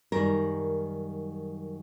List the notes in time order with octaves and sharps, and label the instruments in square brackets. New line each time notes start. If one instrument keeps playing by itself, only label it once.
[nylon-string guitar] F#2 D#3 G3 A#4